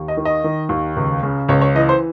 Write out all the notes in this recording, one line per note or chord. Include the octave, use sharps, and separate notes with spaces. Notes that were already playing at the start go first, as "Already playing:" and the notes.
Already playing: D#2
D#5
D#3
D#5
D#3
D#2
C#2
C#3
C#2 C#5
C#5
E3 D#5
C5